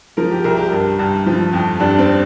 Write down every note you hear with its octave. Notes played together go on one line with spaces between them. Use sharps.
F3 A#4
G4
C2 A#4
G4
G2
G2
F3
F2
G2 D4
C4